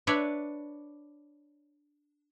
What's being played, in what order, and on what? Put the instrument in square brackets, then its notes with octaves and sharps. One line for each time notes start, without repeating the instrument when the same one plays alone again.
[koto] D4 B4 C#5 D5 E5